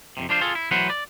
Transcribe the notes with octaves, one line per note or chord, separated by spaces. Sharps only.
F2 G#2 C3
F3 D4 F4 C5
F4 G#4 A4
E4
E3 F#3 A3 B4 C5 F#5
D5